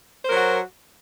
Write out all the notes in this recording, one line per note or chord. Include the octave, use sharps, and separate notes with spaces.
F#3 F#4 A#4 C5